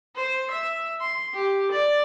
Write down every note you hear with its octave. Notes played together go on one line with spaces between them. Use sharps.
C5
E5
C6
G4
D5